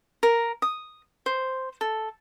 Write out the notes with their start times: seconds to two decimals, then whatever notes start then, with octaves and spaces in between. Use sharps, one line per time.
0.23 A#4
0.62 D#6
1.26 C5
1.81 A4